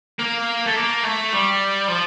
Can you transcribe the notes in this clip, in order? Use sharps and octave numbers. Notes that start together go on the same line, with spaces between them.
A#3
A3
A#3
A3
G3
F3